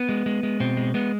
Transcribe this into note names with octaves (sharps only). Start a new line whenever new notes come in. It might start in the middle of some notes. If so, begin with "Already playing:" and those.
Already playing: B3
G#3
G#3
G#3
B2 C4
G#3
G#3 B3